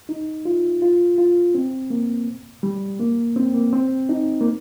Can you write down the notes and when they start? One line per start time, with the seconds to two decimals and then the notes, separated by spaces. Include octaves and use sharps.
0.09 D#4
0.45 F4
0.82 F4
1.18 F4
1.55 C4
1.90 A#3
2.63 G3
3.00 A#3
3.36 C4
3.54 A#3
3.73 C4
4.09 D#4
4.41 A#3